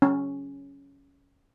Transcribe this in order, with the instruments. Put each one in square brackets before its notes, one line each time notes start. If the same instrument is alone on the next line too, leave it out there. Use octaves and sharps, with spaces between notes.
[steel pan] C#4